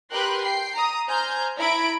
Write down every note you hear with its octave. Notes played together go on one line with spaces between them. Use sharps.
G4 A#4 B4 G5 C6 F#6
G5 C7
A#5 D#6
C5 G#5 A#5 F6 G6
E4 A#5 B5 G#6 D7